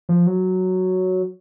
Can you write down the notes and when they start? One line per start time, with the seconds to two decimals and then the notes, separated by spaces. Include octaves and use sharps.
0.09 F3
0.27 F#3